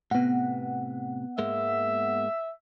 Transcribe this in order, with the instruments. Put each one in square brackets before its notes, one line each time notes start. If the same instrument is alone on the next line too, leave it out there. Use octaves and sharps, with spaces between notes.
[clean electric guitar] A2 C3 [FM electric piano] B3 F#5
[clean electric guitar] G#2 G#3 A#3 [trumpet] E5